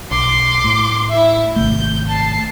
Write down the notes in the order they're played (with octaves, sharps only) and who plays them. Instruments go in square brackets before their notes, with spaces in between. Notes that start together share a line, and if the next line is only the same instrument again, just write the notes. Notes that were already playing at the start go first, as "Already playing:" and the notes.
[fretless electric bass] B1 [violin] C6 D6
[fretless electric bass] A2
[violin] E4 E5
[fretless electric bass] G#1 C3 A3 [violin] G6
[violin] A5 C7